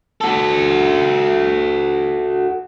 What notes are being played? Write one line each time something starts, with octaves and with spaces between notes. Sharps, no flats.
F#4 A4